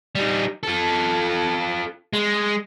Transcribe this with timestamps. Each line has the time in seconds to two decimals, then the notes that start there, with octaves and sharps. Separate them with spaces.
0.15 G3 D#4
0.63 F4 A4
2.13 G#3